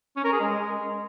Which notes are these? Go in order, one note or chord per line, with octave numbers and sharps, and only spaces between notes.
C#4
A#4
G#4
G#3